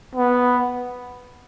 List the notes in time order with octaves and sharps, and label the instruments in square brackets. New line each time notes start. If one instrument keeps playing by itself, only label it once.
[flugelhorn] B3